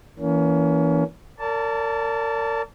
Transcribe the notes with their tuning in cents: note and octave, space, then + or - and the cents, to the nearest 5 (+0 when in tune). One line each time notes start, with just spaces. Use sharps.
E3 +0 A#3 +0 C#4 +30
A#4 -35 D5 -35 A5 +0